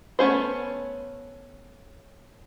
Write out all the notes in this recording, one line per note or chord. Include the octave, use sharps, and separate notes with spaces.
A3 B3 C#4 G#4 C5